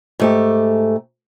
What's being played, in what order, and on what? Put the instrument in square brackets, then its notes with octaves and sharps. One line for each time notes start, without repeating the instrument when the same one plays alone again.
[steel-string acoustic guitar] G#2 A3 G4